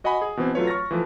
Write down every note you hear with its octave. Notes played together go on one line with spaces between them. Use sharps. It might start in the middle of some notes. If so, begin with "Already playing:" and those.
F#4 D#5 F#5 G#5 B5
G#4
B2 E3 C4
F#3 A3 F4 B4 C#5
C#6 F6 A6 A#6
E3 F3 A3